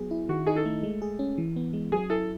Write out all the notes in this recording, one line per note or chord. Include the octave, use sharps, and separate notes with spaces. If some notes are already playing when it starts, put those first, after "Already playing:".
Already playing: F#3 B3 G#4
E4
D#3 F#4
D#4 G#4
A4
A3
G#3
G#4
C#4
E3
B3
G#3
F#3 G#4
E4 A4